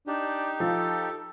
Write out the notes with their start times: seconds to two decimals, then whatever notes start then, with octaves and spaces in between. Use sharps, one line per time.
0.07 D4 D#4 G4
0.60 F3 A4